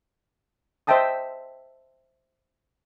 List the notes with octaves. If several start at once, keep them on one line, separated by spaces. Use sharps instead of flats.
C5 D#5 E5 G5 A5 D#6